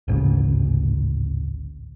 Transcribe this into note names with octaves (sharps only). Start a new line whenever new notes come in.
A1 D2 G#2 C#3